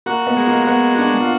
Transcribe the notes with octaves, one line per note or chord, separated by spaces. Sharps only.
A#3 F#4
B3
G#3
A#3
B3 F#4
D4 F#4
F4